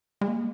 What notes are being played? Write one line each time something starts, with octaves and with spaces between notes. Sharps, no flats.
G#3
A#3